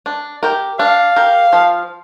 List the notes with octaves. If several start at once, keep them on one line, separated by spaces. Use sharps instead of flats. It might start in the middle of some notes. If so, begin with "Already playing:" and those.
D4
G4 A#4
D4 F5
G4 A#4
F3